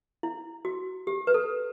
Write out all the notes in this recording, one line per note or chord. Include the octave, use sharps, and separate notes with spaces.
E4
F#4
G4
B4
A4